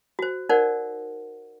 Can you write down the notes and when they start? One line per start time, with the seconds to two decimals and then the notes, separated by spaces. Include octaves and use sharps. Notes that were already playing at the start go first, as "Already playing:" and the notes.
0.19 F#4 C5
0.49 D#4 A#4 C5 D5 F#5